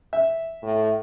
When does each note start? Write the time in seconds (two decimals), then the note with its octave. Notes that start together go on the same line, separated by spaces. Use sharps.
0.13 E5
0.63 A2